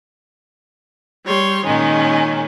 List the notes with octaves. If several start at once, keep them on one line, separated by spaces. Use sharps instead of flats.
G3 C#5 C6
A#2 D#3 G#3 C#4